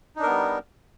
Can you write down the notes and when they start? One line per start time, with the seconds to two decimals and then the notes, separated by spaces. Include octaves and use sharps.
0.16 D#4
0.19 D4
0.23 A#4
0.26 B3
0.30 G3